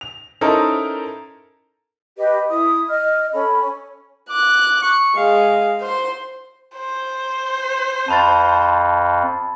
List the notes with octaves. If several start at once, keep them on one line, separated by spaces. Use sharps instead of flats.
F7
C#4 D#4 E4 A4 A#4 C5
G4 B4 D#5
E4 D#6
D#5 F6
C#4 A4 B5
C#4
D6 F#6
C#6
G#3 F5
C5 C6
C5
F2 A5 B5 A6